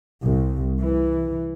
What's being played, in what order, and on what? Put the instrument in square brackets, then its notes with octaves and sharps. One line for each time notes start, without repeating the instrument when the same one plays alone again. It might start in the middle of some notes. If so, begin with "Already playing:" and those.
[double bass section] C2
E3